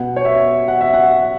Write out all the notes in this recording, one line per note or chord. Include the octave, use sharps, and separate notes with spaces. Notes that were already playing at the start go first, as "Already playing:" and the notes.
Already playing: B2 B3 F#5
C#5
E5
F#5
E5
F#5